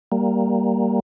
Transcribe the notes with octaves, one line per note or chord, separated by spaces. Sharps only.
G3 A#3